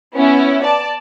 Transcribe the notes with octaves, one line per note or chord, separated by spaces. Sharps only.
B3 C#4 E4
D5 A5